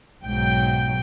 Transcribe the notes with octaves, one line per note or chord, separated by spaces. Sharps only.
B1 G#2 F#3 G5